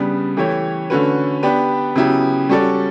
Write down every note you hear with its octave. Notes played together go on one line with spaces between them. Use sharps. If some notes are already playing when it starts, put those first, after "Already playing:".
Already playing: C#3 G3 B3 D4
E3 A3 E4 G4 C#5
D3 A3 C#4 F#4 B4
B3 D4 G4 B4
C#3 F#3 B3 E4 G4
G3 C#4 F#4 A4 D5